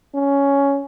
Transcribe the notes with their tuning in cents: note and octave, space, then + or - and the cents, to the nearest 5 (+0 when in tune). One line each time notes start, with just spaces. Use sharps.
C#4 +10